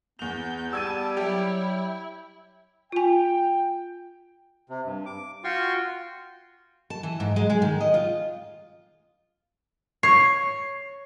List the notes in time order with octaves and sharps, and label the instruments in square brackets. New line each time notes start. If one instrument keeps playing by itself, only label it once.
[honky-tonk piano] E2 F7 [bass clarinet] B3 [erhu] G6
[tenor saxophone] G3 [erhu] A5 [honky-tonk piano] E6 G#6 D#7
[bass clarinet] F#3 [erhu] E4 [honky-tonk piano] G4
[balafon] F4 G#5 [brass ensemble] G5
[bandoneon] C3
G2
D6
F4 F#4 G5 C6 C#6
[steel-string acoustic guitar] A5
E3
G#2
G#3
G#3
D#3
D#5
F4
[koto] C#5 [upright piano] C7